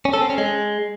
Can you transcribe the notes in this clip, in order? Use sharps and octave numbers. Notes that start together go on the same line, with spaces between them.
C#4
A4
C4
C#4
G#3